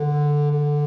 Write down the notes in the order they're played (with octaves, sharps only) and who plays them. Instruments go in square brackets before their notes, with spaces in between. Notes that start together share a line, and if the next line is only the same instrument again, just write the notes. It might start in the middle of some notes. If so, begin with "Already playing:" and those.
Already playing: [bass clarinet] D3
D3